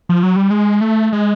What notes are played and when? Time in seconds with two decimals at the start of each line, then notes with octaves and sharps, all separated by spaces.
0.09 F3
0.23 F#3
0.36 G3
0.51 G#3
0.81 A3
1.13 G#3